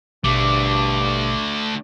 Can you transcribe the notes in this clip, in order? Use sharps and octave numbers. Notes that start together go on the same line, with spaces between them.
A1 G2 B2 A3 D4 D6